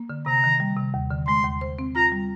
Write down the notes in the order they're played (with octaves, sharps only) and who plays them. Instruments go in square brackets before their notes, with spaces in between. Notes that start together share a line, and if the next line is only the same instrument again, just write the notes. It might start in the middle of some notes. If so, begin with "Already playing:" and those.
Already playing: [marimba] A#3
D3
[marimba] C3 [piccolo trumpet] A#5
[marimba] D#3
G3
C3
D#2
D3
[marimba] G#3 [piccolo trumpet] C6
[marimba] D#2
C5
C4
[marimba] F4 [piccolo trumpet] A#5
[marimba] G3